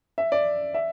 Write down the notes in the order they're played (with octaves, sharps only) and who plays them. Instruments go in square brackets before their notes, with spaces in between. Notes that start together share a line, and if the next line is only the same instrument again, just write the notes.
[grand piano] E5
D5
E5